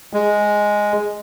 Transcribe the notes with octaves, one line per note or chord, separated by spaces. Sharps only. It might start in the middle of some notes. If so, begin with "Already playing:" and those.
G#3